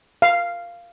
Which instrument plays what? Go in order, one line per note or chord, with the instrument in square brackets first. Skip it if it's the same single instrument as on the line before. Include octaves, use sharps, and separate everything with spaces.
[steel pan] F5